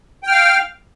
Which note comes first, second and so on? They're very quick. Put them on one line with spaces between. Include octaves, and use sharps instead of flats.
G5 F6 F5